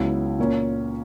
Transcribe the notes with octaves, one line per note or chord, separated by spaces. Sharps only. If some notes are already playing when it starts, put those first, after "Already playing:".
Already playing: C#2 C#3 F#3 B3 E4
A#2 A#3 C#4